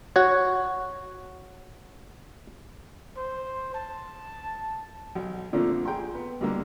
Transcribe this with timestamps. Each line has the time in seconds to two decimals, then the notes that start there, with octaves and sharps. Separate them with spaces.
0.16 F#4 C#5
3.17 C5
3.75 A5
5.15 B1
5.53 A#2 D3 F3 A3 A#3 C4
5.85 G#4 G5 A#5 C6
6.15 B3
6.41 G2 B2 D3 A#3